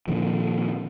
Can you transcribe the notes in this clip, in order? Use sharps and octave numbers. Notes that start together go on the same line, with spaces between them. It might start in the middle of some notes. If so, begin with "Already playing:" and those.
A#2 D3 D#3 F3